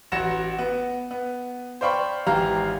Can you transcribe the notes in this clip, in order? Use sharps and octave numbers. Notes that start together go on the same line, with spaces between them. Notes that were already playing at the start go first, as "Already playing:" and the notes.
A1 F#4 F#5 A#6 C#7 E7
B3
B3
C5 D5 F5 G5 B5 C#6
G#1 E3 G4 F5 A#5 F6